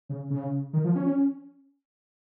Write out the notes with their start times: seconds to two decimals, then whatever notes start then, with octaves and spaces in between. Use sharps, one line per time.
0.09 C#3
0.30 C#3
0.73 D#3
0.84 F3
0.95 C#4
1.06 C#4